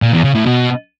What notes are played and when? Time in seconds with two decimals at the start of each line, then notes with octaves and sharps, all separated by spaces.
0.02 A#2
0.13 E2
0.24 C#3
0.35 A2
0.46 B2